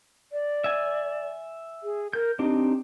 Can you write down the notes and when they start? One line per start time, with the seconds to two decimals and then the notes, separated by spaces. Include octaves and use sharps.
0.32 D5
0.64 E5 G#5
1.83 G#4
2.13 A#4 G6
2.39 C4 D4 D#4 G4